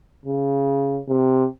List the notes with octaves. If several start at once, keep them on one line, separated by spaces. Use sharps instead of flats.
C#3
C3